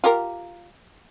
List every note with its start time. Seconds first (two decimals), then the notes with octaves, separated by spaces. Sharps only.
0.04 F4 G4 A#4